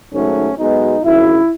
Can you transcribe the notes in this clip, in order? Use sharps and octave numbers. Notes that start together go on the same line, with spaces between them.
G#2 D#3 F#3 A3 C#4
B1 B2 G#3 B3 D#4
G#1 F#2 C#3 E4